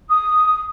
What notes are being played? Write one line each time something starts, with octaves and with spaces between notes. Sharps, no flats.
D#6